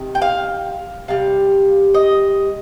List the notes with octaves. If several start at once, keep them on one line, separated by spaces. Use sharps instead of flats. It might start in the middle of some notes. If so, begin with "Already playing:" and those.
Already playing: C3 D#3
G5
F5
C3 G3 F5
D#5